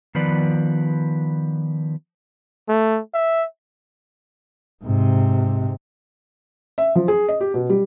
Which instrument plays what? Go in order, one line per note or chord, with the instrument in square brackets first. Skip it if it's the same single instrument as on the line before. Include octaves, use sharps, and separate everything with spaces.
[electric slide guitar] D#3 F3 B3 B4 D5
[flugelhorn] A3
E5
[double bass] G#2 C3
[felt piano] E5
F3
G#4
D#5
G4
B2
G3